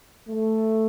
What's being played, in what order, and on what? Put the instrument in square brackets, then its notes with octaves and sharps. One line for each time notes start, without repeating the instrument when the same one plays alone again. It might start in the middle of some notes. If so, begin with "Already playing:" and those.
[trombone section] A3